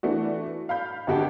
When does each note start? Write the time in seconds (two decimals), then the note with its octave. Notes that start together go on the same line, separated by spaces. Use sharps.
0.03 E3 A3 D4 F#4
0.69 F5 B5 G6
1.07 G#1 D3 F#4 G4 G5 A5